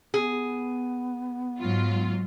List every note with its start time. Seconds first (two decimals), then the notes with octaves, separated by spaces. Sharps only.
0.14 B3 G#4
1.59 G#2 F#3 F4